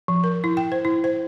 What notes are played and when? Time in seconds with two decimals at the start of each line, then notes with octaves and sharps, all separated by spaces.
0.08 F3
0.24 A#4
0.44 E4
0.57 G5
0.72 C5
0.85 E4
1.04 C5